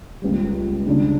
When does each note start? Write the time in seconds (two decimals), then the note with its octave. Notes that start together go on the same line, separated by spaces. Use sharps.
0.22 C#2 C#3 G3
0.86 C#2 C#3 G3 D4